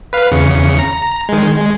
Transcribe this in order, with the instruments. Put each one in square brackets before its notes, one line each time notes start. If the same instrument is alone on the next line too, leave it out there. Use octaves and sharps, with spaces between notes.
[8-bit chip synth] B4 F5
E2 C#3 C#7
A#5
D#3 G#3
G#3